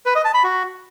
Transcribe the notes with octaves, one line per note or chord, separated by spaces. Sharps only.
B4
D#5
A5
B5
F#4